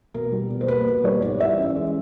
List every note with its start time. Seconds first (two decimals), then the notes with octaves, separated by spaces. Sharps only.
0.14 B2 A#4
0.32 G3
0.50 B2
0.61 C5
0.68 A#3 B4
0.87 B2
1.04 G3 C#5
1.22 G#2 D5
1.40 E3 E5
1.58 C#4
1.76 G#3